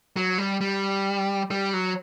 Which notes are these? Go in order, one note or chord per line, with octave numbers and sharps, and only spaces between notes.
F#3
G3
G3
G3
F#3